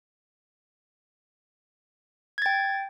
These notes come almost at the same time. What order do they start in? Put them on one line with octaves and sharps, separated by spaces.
G#6 A6 G5